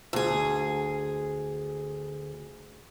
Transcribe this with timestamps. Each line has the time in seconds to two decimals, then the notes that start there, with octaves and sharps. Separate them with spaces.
0.13 D2 G#4